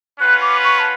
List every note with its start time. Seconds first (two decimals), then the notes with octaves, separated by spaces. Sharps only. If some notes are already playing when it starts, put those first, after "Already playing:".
0.19 C#4 F4 B4 F#5 F#6
0.41 D6
0.64 C#6
0.79 A5